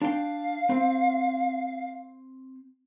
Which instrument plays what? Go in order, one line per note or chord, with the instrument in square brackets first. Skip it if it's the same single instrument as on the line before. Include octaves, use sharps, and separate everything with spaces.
[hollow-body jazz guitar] D4 G5 [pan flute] F5
[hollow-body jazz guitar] C4